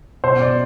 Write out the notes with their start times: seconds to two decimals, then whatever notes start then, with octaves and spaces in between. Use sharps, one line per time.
0.24 B2 C5
0.41 B2 D5